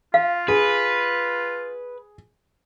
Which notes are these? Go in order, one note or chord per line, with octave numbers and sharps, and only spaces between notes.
F4 F5
G#4 B4